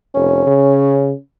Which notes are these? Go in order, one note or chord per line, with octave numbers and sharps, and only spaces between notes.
F1 C#4
C#3